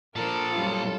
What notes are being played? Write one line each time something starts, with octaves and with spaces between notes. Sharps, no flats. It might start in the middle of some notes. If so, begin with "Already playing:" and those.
A#2 F3 A4 A#4
F#2 G3 F4